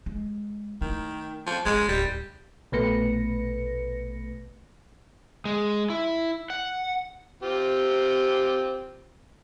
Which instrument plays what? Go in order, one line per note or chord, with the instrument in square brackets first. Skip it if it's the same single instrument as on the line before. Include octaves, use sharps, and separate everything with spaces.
[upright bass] G#3
[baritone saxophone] D#3 [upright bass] A3 E4
[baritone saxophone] F3
[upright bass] G#1 G3 [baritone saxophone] G#3
[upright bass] D1 [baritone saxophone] G3
[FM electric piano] A#1 B2 A3 B4 A#6 C#7
[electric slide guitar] G#3
E4
F#5
[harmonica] C4 F4 G4